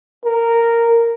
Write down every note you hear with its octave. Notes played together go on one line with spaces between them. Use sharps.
A#4